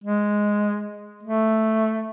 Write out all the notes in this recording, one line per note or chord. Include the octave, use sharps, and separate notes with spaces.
G#3
A3